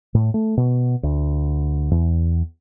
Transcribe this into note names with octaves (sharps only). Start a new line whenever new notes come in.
A2
A3
B2
D2
E2